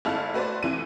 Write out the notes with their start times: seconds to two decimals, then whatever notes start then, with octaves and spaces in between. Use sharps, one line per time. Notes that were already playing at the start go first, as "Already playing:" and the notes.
0.05 G1 G#3 E4 A4 F5 A5
0.33 A3 F#4 B4 C5 D5
0.63 F1 E3 D#7